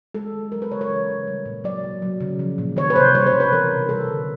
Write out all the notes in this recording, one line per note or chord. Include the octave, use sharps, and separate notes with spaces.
G#3 A4
D#3
F#3 A#4
B4
C#3 C#5
C#5
E3
C#3
G3
A#2
F#3 D5
B2
F#3
C#3
F3
A#2
D#3 C#5
B4
C3 C5
G3 C#5
C5
B2
B4
E3 A#4
C3
G3 A4
D3